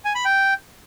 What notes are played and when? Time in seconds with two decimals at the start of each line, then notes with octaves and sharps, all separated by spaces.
0.05 G#5
0.15 B5
0.25 G5